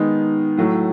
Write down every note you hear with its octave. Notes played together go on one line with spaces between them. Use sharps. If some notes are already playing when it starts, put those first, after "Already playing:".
Already playing: D#3 G#3 B3 D#4
A2 F#3 A3